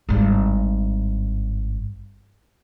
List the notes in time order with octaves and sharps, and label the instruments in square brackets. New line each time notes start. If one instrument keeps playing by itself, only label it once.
[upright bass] G#1 G2